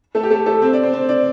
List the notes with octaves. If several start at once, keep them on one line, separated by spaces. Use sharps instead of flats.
A3 A4
G4
A3 A4
A3 A4
C4 C5
D4 D5
C4 C5
C4 C5
D4 D5